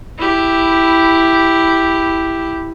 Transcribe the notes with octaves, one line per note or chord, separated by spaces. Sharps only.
E4 G4